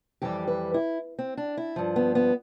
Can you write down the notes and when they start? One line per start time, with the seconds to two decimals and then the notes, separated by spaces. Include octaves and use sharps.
0.22 F2 E3 G3 G4
0.47 B4
0.74 E4
1.19 C4
1.37 D4
1.57 E4
1.76 G2 F3
1.96 B3
2.15 B3